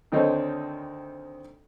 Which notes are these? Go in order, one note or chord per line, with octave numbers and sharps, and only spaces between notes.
D2 D#3 C4 D#4 A4 C#5